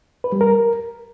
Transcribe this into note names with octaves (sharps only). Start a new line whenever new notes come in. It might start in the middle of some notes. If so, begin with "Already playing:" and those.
B4
G3
A#4